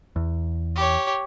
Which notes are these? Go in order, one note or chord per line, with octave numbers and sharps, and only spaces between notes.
E2
G4 C#5